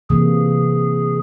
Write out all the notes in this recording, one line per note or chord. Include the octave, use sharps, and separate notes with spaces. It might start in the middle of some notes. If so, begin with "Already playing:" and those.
C3 E3 A#3 G#4